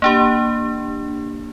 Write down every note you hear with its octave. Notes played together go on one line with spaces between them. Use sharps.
A#3 D4 G4